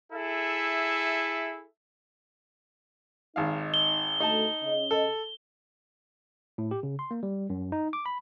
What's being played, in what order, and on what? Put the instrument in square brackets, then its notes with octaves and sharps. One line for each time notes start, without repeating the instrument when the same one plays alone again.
[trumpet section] E4 G#4 A4 E5
[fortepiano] G#1 F5 [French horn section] D#4
[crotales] G7
[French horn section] D2 A3 [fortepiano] D#4 A5
[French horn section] C#3 D#5
[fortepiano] A4
[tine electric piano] A2
G4
C#3
C6
A#3
G3
F#2
D#4
D6
B5